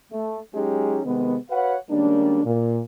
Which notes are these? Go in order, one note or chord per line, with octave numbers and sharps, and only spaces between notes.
A3
F#3 G#3 C#4 D#4 G4 G#4
C3 D#3 G#3 B3
F#4 B4 C#5 F5 F#5
D#3 G3 G#3 A#3 C#4 D4
A#2